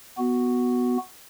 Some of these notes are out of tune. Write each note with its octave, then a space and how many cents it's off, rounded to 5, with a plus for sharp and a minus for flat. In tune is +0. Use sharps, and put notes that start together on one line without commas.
B3 +0 F#4 +0